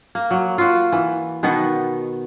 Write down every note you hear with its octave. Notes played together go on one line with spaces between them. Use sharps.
A#3
F#3
F4 F#4
E3
B2 D#3 B3 F#4